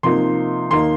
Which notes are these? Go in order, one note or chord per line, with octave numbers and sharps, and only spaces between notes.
C3 F3 A#3 D#4 C6
D#2 D#3 A#3 D#4 C6